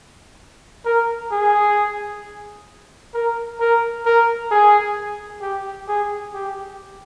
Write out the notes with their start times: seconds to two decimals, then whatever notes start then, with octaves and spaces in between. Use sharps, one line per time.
0.85 A#4
1.31 G#4
3.14 A#4
3.60 A#4
4.05 A#4
4.51 G#4
5.42 G4
5.88 G#4
6.34 G4